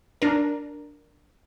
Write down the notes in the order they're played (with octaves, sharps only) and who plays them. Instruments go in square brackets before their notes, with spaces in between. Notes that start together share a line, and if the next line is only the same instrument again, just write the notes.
[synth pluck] D4 A#4